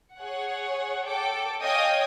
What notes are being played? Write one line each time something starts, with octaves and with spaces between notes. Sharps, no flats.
G#4 C#5 F#5
A4 G5 D6
C#5 D#5 F5 G5 G#5 D#6